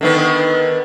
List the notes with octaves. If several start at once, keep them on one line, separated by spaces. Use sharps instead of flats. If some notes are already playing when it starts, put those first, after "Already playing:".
D3 D#3 B3